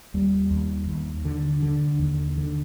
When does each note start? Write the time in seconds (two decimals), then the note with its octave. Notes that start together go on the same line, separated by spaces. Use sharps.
0.14 D#2 G3
0.51 D#2
0.88 D#2
1.25 D3
1.63 D3
1.99 D#2
2.38 D3